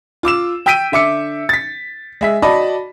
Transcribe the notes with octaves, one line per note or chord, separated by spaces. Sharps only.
F4 D6 E6 E7
G5 E6 G6 B6 D7 D#7
D3 E5 D6 C#7
A6 B6
G#3 E5 B6
F#4 D5 D#5 A5 B5